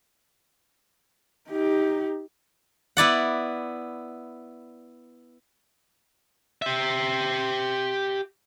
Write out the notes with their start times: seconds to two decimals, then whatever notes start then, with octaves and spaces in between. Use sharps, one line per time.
1.49 D#4 G4
2.97 B3 E4 D5 F#5
6.62 G4 E5